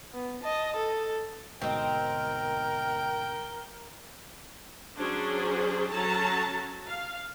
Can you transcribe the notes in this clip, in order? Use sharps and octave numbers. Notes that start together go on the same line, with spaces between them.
B3
D#5 A5
A4
D2 G#2 B2 C4 D#4 A#4 G5
F#3 C#4 D4 G#4 C5
F#3 C#4 A4 A5 A#5
F5